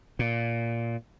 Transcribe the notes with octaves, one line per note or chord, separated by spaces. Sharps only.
A#2